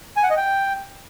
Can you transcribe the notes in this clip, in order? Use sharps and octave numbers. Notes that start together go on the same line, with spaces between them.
G#5
F#5
D#5
G5